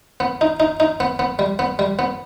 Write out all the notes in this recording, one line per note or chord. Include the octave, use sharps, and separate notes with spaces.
B3
D#4
D#4
D#4
B3
B3
G3
B3
G3
B3